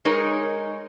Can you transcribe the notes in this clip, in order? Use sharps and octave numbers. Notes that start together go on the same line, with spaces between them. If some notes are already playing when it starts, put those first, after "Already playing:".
G#3 D#4 A#4 C#5